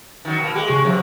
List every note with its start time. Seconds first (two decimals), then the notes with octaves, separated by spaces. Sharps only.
0.25 D#3 F#3
0.40 B2 A#3
0.55 G#3 G4
0.70 C#3 C#6
0.85 G2 C3 F#3